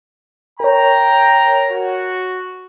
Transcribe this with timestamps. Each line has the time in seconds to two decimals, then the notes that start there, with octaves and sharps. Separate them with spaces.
0.60 A#4 C#5 G5 A#5
1.71 F#4